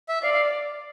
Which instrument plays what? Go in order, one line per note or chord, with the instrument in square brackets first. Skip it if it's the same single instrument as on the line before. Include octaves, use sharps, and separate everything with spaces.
[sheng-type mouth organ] E5
[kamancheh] D5 [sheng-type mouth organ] F5
[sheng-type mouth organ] F5